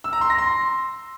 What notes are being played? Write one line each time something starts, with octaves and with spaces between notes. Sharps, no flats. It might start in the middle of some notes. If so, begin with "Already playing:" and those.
E6
A#5
C6
A#6
C6